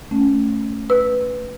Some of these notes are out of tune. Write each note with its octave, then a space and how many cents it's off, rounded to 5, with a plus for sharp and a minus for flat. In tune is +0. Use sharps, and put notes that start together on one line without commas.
A3 +0 C#4 +0
B4 +0 E6 -10